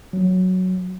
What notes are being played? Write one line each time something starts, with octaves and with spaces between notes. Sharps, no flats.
F#3